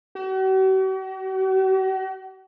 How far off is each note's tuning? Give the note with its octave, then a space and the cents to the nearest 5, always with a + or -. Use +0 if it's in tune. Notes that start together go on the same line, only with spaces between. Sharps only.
F#4 +45